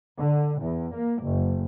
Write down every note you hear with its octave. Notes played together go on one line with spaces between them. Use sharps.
D3
E2
A#3
F#1